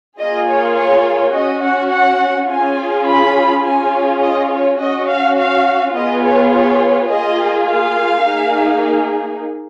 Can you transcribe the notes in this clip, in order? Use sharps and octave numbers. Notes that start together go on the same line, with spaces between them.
A#3 F4 G#4 D#5
C#5
C#5
C#4 F#4 D#5
F#5
F#5
C#4 F4 G#4 G#5
B5
C#4 F4 G#4 G#5
D#5
C#5
C#4 F#4 D#5
F5
F5
B3 F4 G#4 D#5
C#5
C#5
A#3 F4 G#4 D#5
F5
A#3 D#4 G#4